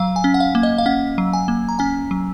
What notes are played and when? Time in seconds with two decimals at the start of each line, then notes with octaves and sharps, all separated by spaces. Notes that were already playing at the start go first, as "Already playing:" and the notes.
Already playing: F#3 F5
0.16 G#5
0.24 C#4
0.34 F#5
0.40 F5
0.55 A#3
0.63 D#5
0.78 F5
0.86 C#4 F#5
1.18 F#3
1.33 G#5
1.48 A#3
1.69 A#5
1.79 C#4 G#5
2.11 F#3